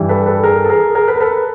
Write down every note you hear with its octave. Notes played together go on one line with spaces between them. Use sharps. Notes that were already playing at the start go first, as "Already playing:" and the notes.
Already playing: G2 E3 G3
A4 B4
A4 B4
G#4 A#4
A4
G#4 A#4
G#4 A#4
A4 B4
A#4
A4 B4